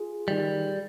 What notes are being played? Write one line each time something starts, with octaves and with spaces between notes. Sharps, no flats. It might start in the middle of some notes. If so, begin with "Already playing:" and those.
Already playing: F4 G#4
D#3 G3